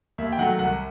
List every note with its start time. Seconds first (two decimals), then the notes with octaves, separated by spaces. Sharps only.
0.18 D#2 E5
0.32 G5
0.38 D#3 F#3 A3 F#5
0.59 C2 F#5